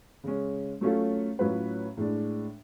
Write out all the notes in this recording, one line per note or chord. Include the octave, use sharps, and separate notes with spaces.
C#3 G#3 C#4
F#3 A3 C#4 F4 A4
A2 F#3 C#4 F4 B4
A2 G#3 D4